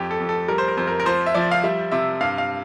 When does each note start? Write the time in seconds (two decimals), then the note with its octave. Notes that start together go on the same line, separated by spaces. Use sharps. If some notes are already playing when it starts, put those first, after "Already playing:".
Already playing: F2 G4
0.11 A4
0.20 F2
0.29 A4
0.48 G3 A#4
0.58 C5
0.68 A#4
0.77 F2 C5
0.87 A#4
1.00 A#4
1.06 F3 C5
1.26 E5
1.35 F3 D5
1.51 F5
1.64 G3 E5
1.92 C3 E5
2.21 G2 F5
2.38 F5